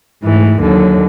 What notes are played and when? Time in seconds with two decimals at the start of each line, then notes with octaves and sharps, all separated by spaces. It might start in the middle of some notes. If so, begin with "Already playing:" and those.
0.23 G#2 E3 A3
0.61 D#2 D3 F#3